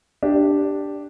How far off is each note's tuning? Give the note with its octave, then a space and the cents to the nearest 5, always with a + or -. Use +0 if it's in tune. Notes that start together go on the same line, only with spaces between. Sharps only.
D4 +0 G4 +0